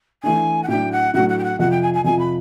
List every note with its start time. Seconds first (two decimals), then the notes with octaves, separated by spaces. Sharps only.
0.23 E3 A3 D4 G#5
0.63 F#5
0.68 A2 F#3 A3 D4 G5
0.92 F#5
1.14 A2 F#3 A3 D4 F#5
1.29 F#5
1.39 G5
1.44 F#5
1.59 F2 C3 F3 F#5
1.71 G5
1.82 G#5
1.94 G#5
2.04 F2 C3 F3 G#5
2.19 B5